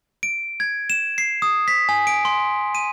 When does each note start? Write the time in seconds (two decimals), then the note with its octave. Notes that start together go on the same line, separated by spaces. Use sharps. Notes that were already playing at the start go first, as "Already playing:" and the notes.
0.23 D7
0.60 G#6
0.90 E7
1.18 C7
1.42 D#6
1.68 B6
1.89 G#5
2.07 D7
2.25 C6
2.75 D#7